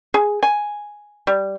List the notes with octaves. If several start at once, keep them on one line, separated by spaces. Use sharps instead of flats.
G#4
G#5
G3